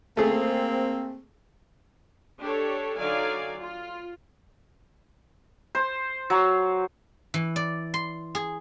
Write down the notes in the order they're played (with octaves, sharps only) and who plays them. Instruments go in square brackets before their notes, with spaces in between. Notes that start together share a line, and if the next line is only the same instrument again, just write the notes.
[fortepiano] A3 G#4 [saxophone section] A#3 C4
[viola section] D4 G4 A4 C#5
D3 F#3 D#4 D5 F5 G#5
F4
[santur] C5
F#3
[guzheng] E3
D5
C6
G#4